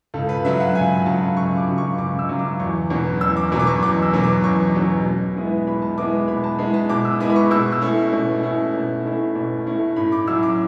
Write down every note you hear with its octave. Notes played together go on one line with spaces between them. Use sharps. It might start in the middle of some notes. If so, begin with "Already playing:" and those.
C#2 A4
B4
C#3 F#3 E5
F#5
C#2 G#5
C#3 F#3 A5
C#2 C#6
D6
C#3 F#3
C#6
C#2 D6
E6
C#3 F#3
D6
E2 C#6
B2 F#3 C#4
E2 E6
D6
B2 F#3 C#4
D6
C#6
E2 D6
E6
B2 F#3 C#4
D6
E2 C#6
B2 F#3 C#4
B2
G#3 B3 E4
B2 B5
A5
G#3 B3 E4 D6
B2 B5
A5
G#3 B3 E4
A5
B2 D6
E6
G#3 B3 E4 D6
B5
C#6
B2 E6
E6
A3 C#4 E4
B2
A3 C#4 E4
B2
A3 C#4 E4
B2
A3 C#4 E4
A2 B5
D6
F#3 C#4 E4 E6
D6